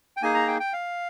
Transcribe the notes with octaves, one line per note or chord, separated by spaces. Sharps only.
G5
A#3 D#4 G#4 G#5
A#5
G5
G5
F5